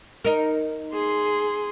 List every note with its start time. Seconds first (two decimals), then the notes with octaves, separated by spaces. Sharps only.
0.25 D#4 A#4
0.93 G#4 C6